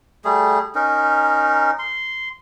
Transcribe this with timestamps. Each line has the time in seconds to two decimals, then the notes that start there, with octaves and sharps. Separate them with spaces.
0.25 G3 A3 G#4
0.75 C#4 D#4 A#4
1.79 C6